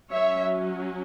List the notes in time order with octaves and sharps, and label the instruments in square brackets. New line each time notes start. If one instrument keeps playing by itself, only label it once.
[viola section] F#3 C#4 C#5 E5